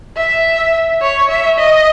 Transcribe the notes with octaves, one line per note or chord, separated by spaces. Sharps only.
E5
C#5
E5
D#5